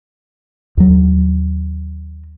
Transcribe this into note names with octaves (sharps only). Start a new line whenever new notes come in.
D#2 F#3